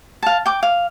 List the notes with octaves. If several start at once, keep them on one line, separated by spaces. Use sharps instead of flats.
F5 A5
G5 D6
F5